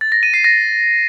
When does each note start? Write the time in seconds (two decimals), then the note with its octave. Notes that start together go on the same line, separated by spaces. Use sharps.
0.01 A6
0.12 A#6
0.23 D#7
0.34 C7
0.44 A#6